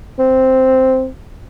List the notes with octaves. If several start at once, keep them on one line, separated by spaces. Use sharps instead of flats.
C4